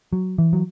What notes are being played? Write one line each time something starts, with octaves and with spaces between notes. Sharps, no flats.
F#3
E3
F#3